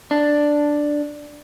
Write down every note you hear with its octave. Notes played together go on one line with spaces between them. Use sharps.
D4